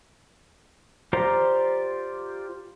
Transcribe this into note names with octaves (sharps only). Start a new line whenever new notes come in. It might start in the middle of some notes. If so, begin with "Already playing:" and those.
F4 G4 C5 D5 A#5